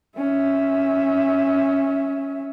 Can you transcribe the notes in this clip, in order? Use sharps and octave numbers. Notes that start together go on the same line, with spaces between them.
C#4 E5